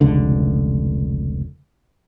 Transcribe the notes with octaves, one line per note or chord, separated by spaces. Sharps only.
F1 C#2 D3